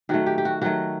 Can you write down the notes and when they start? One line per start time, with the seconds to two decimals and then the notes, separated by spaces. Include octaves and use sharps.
0.09 D#3 F#3 A3 F#4
0.26 G4
0.38 G4
0.45 F#4
0.62 D#3 F#3 A3 F#4